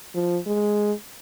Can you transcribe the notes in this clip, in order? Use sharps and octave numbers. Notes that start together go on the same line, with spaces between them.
F3
G#3